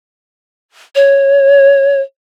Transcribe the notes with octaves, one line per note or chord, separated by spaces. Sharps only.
C#5